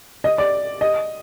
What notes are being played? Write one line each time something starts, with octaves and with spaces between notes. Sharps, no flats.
D#5
D5
D#5